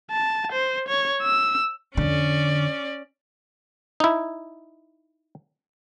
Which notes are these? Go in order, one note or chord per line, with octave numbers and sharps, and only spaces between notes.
A5
C5
C#5
E6
F2 D3 C#4 D5
D#4 E4